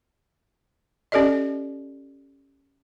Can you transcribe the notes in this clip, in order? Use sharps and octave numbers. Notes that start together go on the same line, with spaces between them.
C#4 G4 A4 D5 D#5